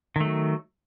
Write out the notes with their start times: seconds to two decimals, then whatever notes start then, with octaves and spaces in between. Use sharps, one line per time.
0.16 D#3
0.20 A3
0.25 F#3